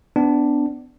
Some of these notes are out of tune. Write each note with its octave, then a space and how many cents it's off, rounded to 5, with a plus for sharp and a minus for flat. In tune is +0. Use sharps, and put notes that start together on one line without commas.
B3 +30 D4 +0